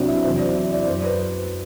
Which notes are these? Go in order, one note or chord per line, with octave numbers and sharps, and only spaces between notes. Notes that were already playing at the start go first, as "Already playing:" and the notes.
Already playing: C2 C3 F#3 C4 D4 F#4
E4
E2 C3 F#3 C5
D5
E4
D5
F#2 F#3 C5
B4